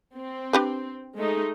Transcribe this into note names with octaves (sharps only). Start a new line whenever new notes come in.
C4
D4 G4 B4
G#3 A3 D#4